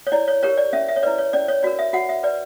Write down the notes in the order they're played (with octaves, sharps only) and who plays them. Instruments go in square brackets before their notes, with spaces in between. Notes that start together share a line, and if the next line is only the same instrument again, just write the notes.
[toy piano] C#5
E4 D5
C#5
G4 A#4 C#5
D5
C#4 E5
E5
C#5
E4 B4 D5
C#5
C#4 D5
C#5
F#4 A#4 D5
E5
F#4 F#5
E5
B4 D5